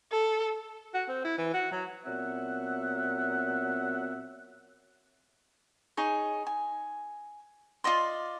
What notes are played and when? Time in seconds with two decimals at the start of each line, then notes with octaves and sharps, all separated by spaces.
0.12 A4
0.94 F#4
1.08 C4
1.24 E4
1.38 E3
1.54 F#4
1.72 F#3
2.04 A#2 F#3 B3 C4 E5 F#5
5.97 D#4 G#4 C#5
6.47 G#5
7.84 F4 D5 D#5 C6